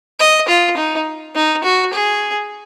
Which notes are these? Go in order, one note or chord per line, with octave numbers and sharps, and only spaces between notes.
D#5
F4
D#4
D#4
F#4
G#4